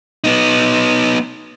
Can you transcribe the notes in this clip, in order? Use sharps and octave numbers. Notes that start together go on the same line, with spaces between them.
B3 D#4